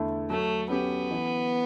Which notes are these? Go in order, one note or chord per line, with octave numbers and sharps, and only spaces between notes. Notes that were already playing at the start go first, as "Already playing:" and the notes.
Already playing: E2 D3 A3 E4 A4
F#3 A3
B3 C#4 G4
E3